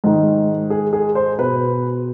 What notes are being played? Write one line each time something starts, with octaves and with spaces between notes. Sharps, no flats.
G#2 D#3 D#4
G#4
G#4
C5
B2 B4